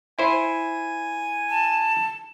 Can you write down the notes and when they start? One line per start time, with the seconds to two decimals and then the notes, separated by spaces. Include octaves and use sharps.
0.19 E4 C5 G#5
1.50 A5